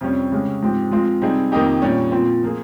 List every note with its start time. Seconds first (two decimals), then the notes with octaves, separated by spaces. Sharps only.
0.01 F2 C3 G3 C#4
0.32 C#3 G#3 C#4 G4
0.62 G#2 F3 C4 G4
0.91 F3 G#3 C4 F4
1.22 C3 G3 C4 D#4 G#4
1.52 F2 D#3 A#3 D#4 G4
1.82 A#2 G3 C#4
2.12 A#2 F3 C4
2.43 F3 A#3 F4 G#4